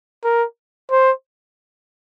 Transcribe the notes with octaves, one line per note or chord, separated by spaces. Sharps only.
A#4
C5